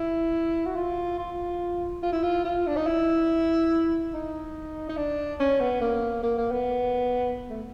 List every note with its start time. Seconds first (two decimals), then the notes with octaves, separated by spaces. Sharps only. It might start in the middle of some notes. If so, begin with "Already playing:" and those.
Already playing: E4
0.66 F#4
0.76 F4
1.18 F4
2.03 F4
2.12 E4
2.23 F4
2.44 F4
2.66 D4
2.76 D#4
2.87 E4
4.14 D#4
4.89 D#4
4.97 D4
5.40 C#4
5.60 B3
5.81 A#3
6.23 A#3
6.38 A#3
6.51 B3
7.50 A3